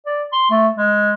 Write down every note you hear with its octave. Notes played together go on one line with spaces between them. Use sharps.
D5
C6
A3
G#3